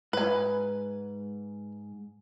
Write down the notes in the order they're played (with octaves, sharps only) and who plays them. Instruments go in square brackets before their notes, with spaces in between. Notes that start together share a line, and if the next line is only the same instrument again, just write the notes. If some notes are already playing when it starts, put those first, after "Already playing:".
[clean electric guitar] G#2 [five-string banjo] B4 G#5